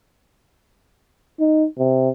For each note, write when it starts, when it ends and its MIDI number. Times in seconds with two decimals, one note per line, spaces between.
1.40 1.66 63
1.78 2.09 48